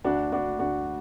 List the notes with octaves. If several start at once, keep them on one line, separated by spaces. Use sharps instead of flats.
D2 D4 F#4
D2 D4 F#4
D2 D4 F#4